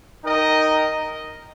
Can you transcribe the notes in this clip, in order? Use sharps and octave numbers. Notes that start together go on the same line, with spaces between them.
D#4 A#4 D#5 G5